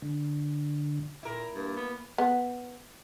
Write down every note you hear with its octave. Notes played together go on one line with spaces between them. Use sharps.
D3
A#2 E4 A#4
G2 A#3
B3
B3